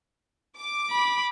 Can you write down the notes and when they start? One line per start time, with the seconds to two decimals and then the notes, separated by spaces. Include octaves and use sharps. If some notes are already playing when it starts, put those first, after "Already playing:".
0.58 D6
0.91 B5